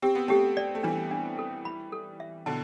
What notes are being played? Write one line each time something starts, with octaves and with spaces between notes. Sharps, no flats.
C4 G4
B3
A3 C4 G4
D5
A3
E3 G3 D4
D4
A4
B5
A4
E5
B2 D3 A5